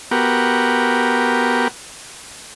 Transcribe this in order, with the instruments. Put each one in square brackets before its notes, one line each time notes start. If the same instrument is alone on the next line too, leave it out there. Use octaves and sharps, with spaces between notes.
[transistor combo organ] B3 F#4 G4 A#4